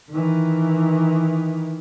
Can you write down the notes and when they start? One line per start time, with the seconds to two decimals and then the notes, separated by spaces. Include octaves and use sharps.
0.11 D#3 E3